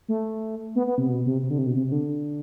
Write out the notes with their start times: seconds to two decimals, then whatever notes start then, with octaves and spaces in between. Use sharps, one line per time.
0.08 A3
0.75 B3
0.87 B3
0.98 C3
1.09 B2
1.26 C3
1.42 C3
1.50 D3
1.58 C3
1.66 B2
1.75 C3
1.87 C3
1.92 D3